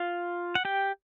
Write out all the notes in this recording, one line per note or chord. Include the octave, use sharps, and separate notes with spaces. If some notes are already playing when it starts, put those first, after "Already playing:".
Already playing: F4 F5
F#5
G4 G5